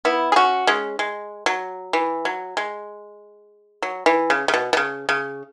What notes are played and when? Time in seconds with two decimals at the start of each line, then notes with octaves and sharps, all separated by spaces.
0.05 B3 E4
0.32 G#4
0.36 C#4 F#4
0.67 G#3 C#4
0.99 G#3
1.46 F#3
1.93 E3
2.25 F#3
2.57 G#3
3.82 F#3
4.06 E3
4.30 C#3
4.48 C#3
4.54 B2
4.73 B2
4.77 C#3
5.09 C#3